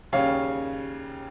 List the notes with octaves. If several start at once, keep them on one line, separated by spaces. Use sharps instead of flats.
D#2 C#3 G3 C#4 C#5 F5